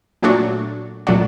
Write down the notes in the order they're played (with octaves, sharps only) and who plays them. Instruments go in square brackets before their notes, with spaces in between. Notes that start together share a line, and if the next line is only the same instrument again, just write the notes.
[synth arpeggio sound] A#2 F#3 A3 D4 F#4
A#2 F#3 A3 D4 F#4